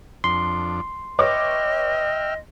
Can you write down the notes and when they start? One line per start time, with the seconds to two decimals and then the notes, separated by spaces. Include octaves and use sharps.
0.24 F2 D4 C6
1.19 B4 C#5 D#5 E5 G5 D6 F6